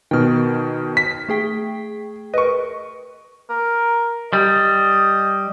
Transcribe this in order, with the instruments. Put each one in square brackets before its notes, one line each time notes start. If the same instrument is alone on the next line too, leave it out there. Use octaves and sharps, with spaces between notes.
[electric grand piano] B2 D#3 [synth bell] G5 F6
[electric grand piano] B6
[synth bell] A3 G#4 G5
[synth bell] A#4 B4 [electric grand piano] D#5 C#6
[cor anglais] A#4
[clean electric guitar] G3 [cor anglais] D#5